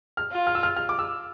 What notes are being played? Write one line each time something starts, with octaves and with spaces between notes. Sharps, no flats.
F6
F4
F6
E6
F6
F6
D6
E6